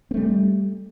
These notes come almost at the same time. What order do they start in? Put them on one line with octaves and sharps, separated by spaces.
C4 A3 G3